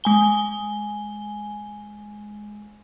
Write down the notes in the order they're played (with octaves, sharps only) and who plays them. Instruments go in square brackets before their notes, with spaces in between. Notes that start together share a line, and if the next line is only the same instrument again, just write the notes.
[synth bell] G#3 G#5 G7